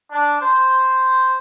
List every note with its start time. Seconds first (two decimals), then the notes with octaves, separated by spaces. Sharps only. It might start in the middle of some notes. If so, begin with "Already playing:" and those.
0.11 D4
0.41 C5